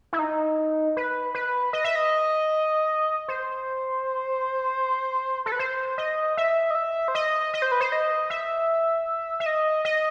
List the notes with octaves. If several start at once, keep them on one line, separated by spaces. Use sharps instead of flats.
E4
D#4
B4
B4
D#5
E5
D#5
C5
A4
B4
C5
D#5
E5
D#5
E5
C5
D#5
D#5
C5
B4
C5
D#5
E5
E5
D#5
D#5